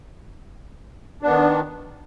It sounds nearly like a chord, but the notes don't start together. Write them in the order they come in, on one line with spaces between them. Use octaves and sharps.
D4 B3 D#3